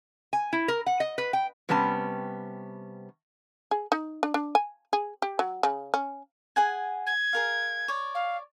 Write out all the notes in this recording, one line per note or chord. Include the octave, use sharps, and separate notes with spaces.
G#5
E4
A#4
F#5
D#5
B4
G5
C3 G3 B3 C#4 A5
G#4
D#4
D4
D4
G#5
G#4
G4
F#3
C#3
C#4
G#4 F#5 G#5
G#6
G#4 A#4 F5
C#5 D5
F5